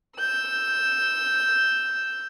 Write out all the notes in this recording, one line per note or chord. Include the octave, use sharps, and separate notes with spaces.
E6 G6